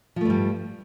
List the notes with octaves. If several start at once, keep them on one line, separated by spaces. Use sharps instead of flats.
G2 F3 G3 A3